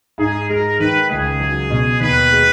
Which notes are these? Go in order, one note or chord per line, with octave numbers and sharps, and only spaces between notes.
G#2 G#4
G#3 A#4
D#3 B4
C#2 G#4
F#3
B2
D#2 B4
G#3